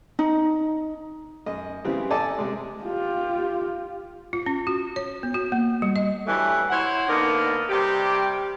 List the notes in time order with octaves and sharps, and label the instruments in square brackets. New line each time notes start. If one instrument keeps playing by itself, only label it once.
[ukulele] D#4
[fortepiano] F#2 D#5
C#3 E3 G3 B3 C4
A4 D5 D#5 G#5 A5 D6
C3 G#3
[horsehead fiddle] F4 G4
[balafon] F4
C#4
F#4
C#5
B3
F#4
A#3
G3
D#5
[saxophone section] G2 E3 F#3 A3
E4 C5 C#5 F#5
D3 A#3 B3 D#4 A#4
C3 G3 G4